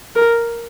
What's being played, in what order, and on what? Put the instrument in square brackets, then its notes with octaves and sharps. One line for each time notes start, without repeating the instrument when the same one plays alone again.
[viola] A#4